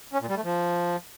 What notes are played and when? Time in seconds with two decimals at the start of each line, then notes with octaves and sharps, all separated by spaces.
0.13 C#4
0.21 A#2
0.29 G3
0.36 A3
0.44 F3